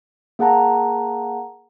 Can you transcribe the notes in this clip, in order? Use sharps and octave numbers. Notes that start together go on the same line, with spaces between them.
A#3 G#4 F#5 A5 A#5